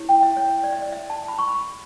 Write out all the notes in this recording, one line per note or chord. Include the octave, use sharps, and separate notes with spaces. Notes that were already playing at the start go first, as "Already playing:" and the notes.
Already playing: E4 G4 C#5
G5
E5
C#5
D5
E5
D5
E5
A5
B5
C#6
B5